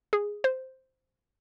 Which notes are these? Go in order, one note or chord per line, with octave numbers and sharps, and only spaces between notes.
G#4
C5